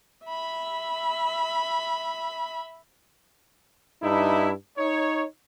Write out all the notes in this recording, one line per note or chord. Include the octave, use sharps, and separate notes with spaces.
E5 B5
G2 D#4 E4
D#4 C#5